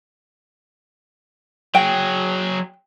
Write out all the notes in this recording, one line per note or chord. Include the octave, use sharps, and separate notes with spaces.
F#3 G#4 G5